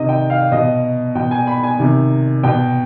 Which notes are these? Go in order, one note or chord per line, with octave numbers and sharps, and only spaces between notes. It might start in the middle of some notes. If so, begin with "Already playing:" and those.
Already playing: C3 D#3 D#5
G5
F5
B2 D#5
B2 G5
G#5
B5
G#5
C3 D#3
B2 G5